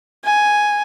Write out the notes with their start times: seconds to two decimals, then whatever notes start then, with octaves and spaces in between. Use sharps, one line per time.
0.25 G#5